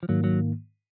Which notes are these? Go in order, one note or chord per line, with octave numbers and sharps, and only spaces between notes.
F3
G#2 D#3 F#3 A#3
F#3